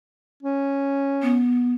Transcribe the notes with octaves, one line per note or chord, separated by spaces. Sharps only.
C#4
B3